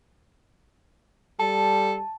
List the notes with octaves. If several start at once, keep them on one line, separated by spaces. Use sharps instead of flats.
G3 A4 A5